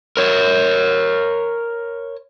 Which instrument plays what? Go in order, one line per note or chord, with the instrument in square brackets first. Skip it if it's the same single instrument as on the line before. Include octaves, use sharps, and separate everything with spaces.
[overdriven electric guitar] A#4 C#5